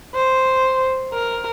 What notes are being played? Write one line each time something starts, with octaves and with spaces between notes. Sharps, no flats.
C5
A#4